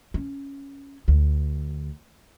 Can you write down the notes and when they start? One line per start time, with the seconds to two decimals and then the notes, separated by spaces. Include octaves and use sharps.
0.14 C#4
1.08 D2